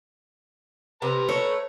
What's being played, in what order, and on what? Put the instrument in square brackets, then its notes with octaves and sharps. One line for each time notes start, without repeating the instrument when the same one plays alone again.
[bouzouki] C3 [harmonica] B4 A#5
[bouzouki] A3 [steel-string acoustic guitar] C#5